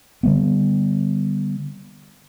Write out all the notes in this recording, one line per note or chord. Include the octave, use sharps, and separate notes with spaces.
D3 G3 B3